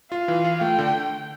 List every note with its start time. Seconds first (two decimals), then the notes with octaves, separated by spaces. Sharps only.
0.12 F4 F5
0.28 E3
0.45 F4
0.61 A3 G5
0.79 D3